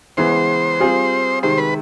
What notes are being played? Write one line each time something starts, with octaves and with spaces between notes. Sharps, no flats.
C#3 E3 G#3 B3 C5
G3 C4 F4 G#4
C3 D#3 G#3 C5
B4